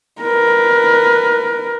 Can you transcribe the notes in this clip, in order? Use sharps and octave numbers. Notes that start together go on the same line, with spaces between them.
A#4 B4